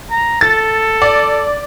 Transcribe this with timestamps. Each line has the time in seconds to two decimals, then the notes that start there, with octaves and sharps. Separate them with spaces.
0.11 A#5
0.41 A4 A6
1.02 D5